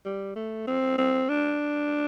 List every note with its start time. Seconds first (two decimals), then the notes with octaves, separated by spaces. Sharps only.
0.05 G3
0.36 A3
0.67 C4
0.98 C4
1.29 D4